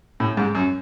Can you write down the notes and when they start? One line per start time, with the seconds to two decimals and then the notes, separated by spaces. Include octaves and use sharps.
0.20 A2
0.37 G#2
0.55 F#2